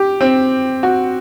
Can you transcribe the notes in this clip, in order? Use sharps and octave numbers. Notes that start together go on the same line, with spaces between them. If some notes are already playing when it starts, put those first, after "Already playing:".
Already playing: G4
C4
F#4